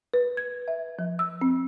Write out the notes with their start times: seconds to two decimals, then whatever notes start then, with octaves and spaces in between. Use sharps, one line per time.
0.14 B4
0.37 G#6
0.68 E5
0.99 F3
1.19 E6
1.41 C4